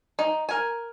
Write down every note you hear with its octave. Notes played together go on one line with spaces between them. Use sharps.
D#4
A#4 G#5